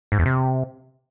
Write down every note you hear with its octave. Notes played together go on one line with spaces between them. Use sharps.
G#2
E2
C3